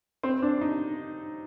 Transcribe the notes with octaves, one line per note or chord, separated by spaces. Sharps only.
C4
D4
D#4